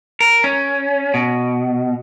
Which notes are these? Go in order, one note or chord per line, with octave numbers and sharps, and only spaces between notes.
A#4
C#4
B2